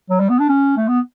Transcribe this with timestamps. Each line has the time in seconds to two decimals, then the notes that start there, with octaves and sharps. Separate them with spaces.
0.10 F#3
0.20 G3
0.30 B3
0.39 D4
0.49 C#4
0.77 A3
0.88 B3